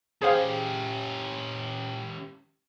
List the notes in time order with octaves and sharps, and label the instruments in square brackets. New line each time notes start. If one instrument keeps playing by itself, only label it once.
[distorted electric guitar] C#4 G4 [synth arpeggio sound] G#4 C5 F5